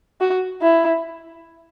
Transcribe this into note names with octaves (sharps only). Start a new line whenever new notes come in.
F#4
E4